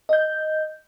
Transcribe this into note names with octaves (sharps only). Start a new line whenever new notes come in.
D#5 G6